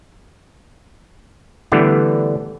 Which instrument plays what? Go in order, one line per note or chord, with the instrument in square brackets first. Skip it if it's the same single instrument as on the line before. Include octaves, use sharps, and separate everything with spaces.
[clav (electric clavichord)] D3 E3 G3 A3 B3 D4